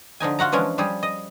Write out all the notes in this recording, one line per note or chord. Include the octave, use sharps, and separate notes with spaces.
D3 F3 D#4 G#5
F4 F#4 F#5 A#5
E3 F3 G#3 C#4 D4
F3 G3 G4 G#4
D#5